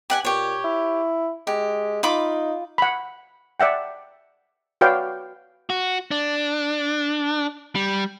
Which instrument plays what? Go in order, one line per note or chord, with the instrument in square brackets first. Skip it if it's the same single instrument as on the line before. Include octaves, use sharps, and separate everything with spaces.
[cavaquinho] G4 F#5 G#5
[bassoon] A#2 [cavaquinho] G4 C#5
[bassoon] E4
[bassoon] G#3 [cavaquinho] G4
[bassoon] D#4 [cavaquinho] F4 B5 D6
[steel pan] F#5 B5
D5 E5 F#5 G5
F#4 B4 C#5 D5 F5 G5
[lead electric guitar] F#4
D4
G3